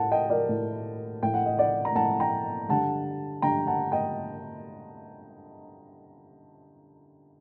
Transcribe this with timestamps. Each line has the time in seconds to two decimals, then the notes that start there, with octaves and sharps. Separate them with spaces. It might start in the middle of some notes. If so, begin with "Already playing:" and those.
Already playing: A2 F#5 A5
0.11 D#5 G5
0.30 A#4 D5
0.49 A2
1.23 A2 G5
1.34 F#5
1.46 D#5
1.58 D5 F#5
1.85 A#5
1.95 A2 F#5 A5
2.20 G5 A#5
2.69 G2 D3 F#5 A5
3.42 G2 D3 G5 A#5
3.67 F#5 A5
3.92 D#5 G5